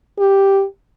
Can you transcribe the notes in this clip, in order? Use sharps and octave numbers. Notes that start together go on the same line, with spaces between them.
G4